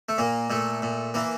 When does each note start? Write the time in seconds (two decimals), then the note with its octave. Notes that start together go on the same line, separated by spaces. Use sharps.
0.09 A3
0.18 A#2 A#3
0.50 A#2 A3
0.82 A#2
1.14 E3 A#3